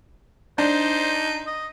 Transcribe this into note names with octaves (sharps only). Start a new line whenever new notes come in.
D4 D#4 C5
D#5